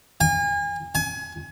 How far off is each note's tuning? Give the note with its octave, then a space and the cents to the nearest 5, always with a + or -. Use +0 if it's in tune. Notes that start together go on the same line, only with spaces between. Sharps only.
G#5 -35
G#5 +30